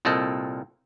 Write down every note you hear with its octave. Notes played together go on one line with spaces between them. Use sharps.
C2 A#2 C4 A4 D#5 G5